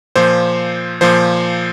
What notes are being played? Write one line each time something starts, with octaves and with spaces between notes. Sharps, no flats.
A#2 F3 C5
A#2 F3 C5